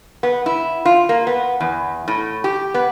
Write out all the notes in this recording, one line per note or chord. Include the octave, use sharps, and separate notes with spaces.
B3
E4
F4
A#3
B3
E2
A2
G4
B3